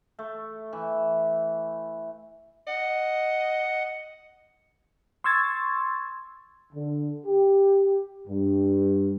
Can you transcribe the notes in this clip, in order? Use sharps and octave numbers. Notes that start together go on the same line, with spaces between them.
A3
E3
D#5 F#5
C6 C#6 E6 G#6 A6
D3
G4
G2